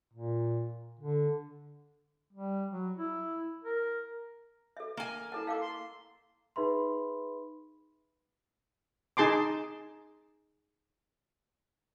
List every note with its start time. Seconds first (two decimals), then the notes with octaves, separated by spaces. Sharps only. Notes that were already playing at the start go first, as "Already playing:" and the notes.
0.14 A#2
1.00 D3
2.33 G3
2.71 F#3
2.97 E4
3.64 A#4
4.77 A4 E5
4.97 A#3 G#5
5.32 E4 A4 F#5 A5
5.47 A4 F5 F#5 D6
5.61 C6
6.56 D#4 G#4 B4 E5 B5 C6
9.17 D#4 G#4 A5 C6 D6